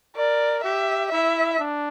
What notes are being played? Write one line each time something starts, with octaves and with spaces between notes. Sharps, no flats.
A#4 D5
G4 E5
E4 E5
D4